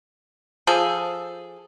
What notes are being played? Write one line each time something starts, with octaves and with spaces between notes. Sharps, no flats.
F3 G#4 A4